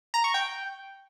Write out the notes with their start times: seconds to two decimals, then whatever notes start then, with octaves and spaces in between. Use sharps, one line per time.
0.14 A#5
0.24 C#6
0.34 G5